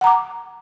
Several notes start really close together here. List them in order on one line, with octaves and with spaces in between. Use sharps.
F#5 A#5 D6